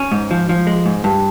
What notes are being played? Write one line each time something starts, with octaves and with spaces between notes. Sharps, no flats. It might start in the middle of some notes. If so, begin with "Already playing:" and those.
Already playing: C#4
G#2
F3
F3
G#3
G#2
G2